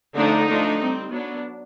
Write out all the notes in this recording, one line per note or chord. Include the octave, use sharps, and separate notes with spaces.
D3 F3 A3 D4 D#4
F3 A3 D4
G3 C4
F#3 B3 D4